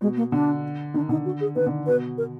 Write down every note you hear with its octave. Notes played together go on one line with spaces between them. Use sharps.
B2 G#3
A#3
D3 D4
D#3 D4
D3 D#4
F#4
G#4
D#3 B4
D3
B2 B4
A#4